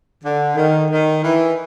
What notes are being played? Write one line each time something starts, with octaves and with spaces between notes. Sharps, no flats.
D3
D#3
D#3
E3